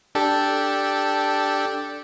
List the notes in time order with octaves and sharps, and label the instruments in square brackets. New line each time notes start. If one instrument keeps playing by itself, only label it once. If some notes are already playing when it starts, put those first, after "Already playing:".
[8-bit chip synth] D4 G4 A4